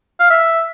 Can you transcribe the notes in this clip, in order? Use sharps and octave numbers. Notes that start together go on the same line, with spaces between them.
F5
E5